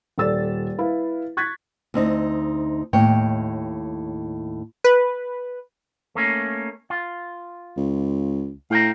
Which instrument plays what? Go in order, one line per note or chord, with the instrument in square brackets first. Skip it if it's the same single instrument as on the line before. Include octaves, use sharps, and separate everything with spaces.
[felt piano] D#1 A4 D5 E6 A6
E4 B4 F5
C#6 F#6 G#6 A6 B6
[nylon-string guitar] D2 C4 D#4
D#2 A2 C#5 G5
[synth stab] B4
[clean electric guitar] A3 A#3 C#4
F4
[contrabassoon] C#2
[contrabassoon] A2 [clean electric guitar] F5 G5 A#5